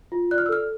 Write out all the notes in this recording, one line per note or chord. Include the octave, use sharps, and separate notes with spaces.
F4
D5 F#6
F6
E6
A4 F6